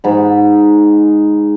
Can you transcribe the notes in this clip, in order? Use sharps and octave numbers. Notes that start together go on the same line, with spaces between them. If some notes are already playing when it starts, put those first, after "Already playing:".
G#2 B5